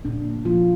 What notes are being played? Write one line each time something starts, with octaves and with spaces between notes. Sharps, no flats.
A#2 D4
A#3
A#2 F3 F4